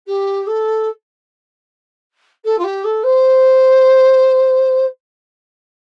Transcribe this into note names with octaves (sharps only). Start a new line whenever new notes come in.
G4
A4
A4
F4
G4
A4
C5